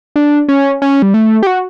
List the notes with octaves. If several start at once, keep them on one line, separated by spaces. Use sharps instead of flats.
D4
C#4
C#4
G3
A3
G4
F#4